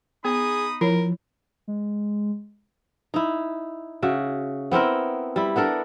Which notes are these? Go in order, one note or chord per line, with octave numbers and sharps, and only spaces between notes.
B3 D#4 G#4 B5 D#6
F3 E4 A#4 C#5
G#3
D#4 E4
C#3 F#4 E5
B3 C4 E4 A#4
G3 E4
B3 D4 A4 A#4